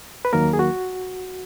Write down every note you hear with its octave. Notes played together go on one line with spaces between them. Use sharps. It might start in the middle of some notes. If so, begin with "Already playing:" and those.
B4
D#2 D#3 F#3 A#3 A#4
G#4
F#4